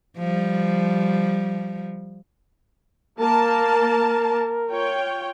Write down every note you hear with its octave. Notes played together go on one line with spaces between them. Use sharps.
F3 G3
A#3 A#4 A5
F4 C#5 G5